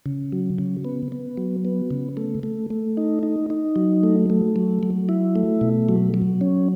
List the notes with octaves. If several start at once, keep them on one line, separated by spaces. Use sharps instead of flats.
C#3
F#3
C#3
B3
B3
F#3
B3
C#3
A3
A3
A3
D#4
D#4
D#4
F#3
A3
A3
F#3
F#3
E4
A3
B2
F#3
F#3
C#4